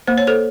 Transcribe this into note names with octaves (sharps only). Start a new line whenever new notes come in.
A#3 C5
C#5
A4 C5